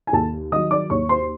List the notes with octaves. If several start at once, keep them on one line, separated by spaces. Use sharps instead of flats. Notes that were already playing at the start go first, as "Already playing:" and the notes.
G#5
D#2 A4 A5
D#3 F#3 D#5 D#6
D5 D6
D#2 C#5 C#6
C5 C6